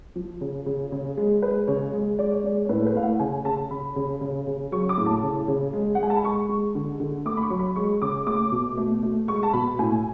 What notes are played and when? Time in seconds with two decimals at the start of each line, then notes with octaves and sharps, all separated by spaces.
0.16 F3
0.41 C#3
0.66 C#3
0.92 C#3
1.17 G#3
1.42 G#3 B4
1.68 C#3 C#5
1.93 G#3
2.19 G#3 D5
2.32 C#5
2.44 G#3 D5
2.65 C#5
2.69 A2 B4
2.82 A4
2.86 B4
2.95 A3 F5
3.03 F#5
3.19 C#3 G#5
3.45 C#3 A5
3.71 C#3 B5
3.96 C#3
4.21 C#3
4.47 C#3
4.72 F#3 C#6
4.89 D6
4.98 A2
5.06 A5
5.23 C#3
5.48 C#3
5.73 G#3
5.95 F#5
5.98 G#3 G#5
6.10 A5
6.16 B5
6.24 G#3 C#6
6.49 G#3
6.75 D3
7.00 D3
7.25 A3 D6
7.37 B5
7.42 C#6
7.50 F#3
7.59 B5
7.76 G#3 C#6
8.02 C#3 D6
8.26 A3 D6
8.52 B2
8.77 A3
9.03 A3
9.28 G#3 C#6
9.43 A5
9.53 B2 B5
9.79 A2 G#5